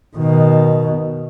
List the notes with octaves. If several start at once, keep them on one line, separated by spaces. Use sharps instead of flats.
B2 D#3